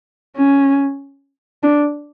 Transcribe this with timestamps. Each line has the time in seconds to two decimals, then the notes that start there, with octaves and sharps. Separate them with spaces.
0.36 C#4
1.63 D4